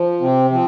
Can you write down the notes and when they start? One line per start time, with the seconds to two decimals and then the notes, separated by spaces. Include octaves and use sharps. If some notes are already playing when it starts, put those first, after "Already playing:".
Already playing: F3
0.21 C3 C4
0.50 F3 C4